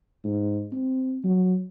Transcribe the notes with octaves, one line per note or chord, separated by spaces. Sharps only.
G#2
C4
F#3